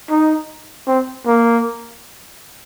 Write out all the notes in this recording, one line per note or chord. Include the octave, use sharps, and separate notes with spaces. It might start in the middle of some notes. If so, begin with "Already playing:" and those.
D#4
C4
A#3